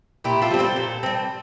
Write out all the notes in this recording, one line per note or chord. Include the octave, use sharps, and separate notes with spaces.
A#2 E4 G4
F4 A4
G3 C4
A4 C5
A#2
G3 C4